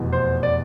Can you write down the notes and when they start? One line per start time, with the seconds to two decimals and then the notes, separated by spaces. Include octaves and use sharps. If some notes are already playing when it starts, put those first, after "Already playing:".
Already playing: F1 E2 B2
0.13 C5
0.43 D5